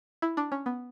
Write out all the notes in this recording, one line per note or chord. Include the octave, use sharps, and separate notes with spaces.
E4
D4
C#4
B3